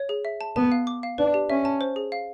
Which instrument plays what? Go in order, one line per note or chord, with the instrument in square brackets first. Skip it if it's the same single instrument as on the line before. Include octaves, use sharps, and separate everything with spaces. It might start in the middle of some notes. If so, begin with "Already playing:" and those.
Already playing: [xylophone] C#5
G#4
E5
A5
[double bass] B3 [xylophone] A5
[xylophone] F5
D6
F5
[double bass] D4 [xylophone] B4
[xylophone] G4
[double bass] C#4 [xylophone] E5
[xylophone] A5
C5
G#4
F5